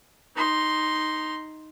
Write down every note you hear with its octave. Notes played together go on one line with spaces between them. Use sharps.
D#4 C6